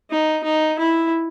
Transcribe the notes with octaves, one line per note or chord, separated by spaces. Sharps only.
D#4
D#4
E4